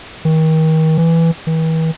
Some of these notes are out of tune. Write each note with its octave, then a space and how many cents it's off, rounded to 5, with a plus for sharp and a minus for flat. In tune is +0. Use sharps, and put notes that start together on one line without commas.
D#3 +35
E3 +5
E3 -40